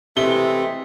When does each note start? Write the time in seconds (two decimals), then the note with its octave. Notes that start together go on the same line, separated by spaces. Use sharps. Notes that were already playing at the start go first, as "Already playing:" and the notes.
0.17 C3 E3 G#3 A3 G7